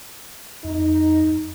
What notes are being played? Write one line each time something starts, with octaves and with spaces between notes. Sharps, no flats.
F2 D#4